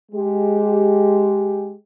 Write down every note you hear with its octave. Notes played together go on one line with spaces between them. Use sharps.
G#3 G4